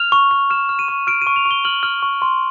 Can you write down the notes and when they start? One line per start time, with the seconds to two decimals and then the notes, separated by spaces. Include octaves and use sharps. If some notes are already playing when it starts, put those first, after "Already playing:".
Already playing: F6 F7
0.12 C#6
0.31 C#6
0.50 F6 E7
0.69 F6
0.79 D#7
0.88 C#6
1.07 F6 D7
1.22 D#7
1.27 C#6
1.36 F7
1.46 C#6
1.51 G7
1.65 F6 F#7
1.83 F6
2.02 C#6
2.22 C6